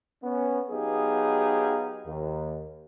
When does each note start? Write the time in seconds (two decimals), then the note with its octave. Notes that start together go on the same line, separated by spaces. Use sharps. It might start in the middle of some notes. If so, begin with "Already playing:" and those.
0.24 B3 C#4
0.71 F#3 B3 D#4 G4 G#4 F5
2.07 D#2